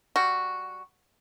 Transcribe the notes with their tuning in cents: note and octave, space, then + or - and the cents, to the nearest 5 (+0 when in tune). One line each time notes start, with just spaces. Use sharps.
G3 +5 F#4 +0